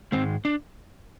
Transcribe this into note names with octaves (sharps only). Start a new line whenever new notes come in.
G#2 D#3 G#3 C4
D4